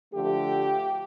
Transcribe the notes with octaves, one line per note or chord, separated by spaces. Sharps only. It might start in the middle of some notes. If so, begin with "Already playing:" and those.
D3 F3 A3 G4